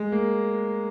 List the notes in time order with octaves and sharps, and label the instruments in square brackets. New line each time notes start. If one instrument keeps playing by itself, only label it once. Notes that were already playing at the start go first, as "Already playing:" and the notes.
Already playing: [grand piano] G#3
A#3